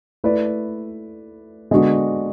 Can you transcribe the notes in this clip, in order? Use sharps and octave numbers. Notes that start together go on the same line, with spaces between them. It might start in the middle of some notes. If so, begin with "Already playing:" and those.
A3 E4 B4 D5
D3 G#3 B3 D4 F#4